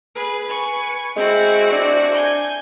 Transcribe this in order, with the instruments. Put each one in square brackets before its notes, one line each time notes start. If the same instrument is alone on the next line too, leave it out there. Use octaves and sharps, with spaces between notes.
[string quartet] G#4 B4
B4 G#5 C#6
[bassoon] G#3 [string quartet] C4 E4 F#4
[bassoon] D4
[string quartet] G#5 G6